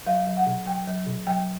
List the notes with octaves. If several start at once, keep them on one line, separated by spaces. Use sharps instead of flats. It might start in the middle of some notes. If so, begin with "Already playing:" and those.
F#3 F5
F#3
F#5
B2
F#3 G5
F#3
B2
F#3 G5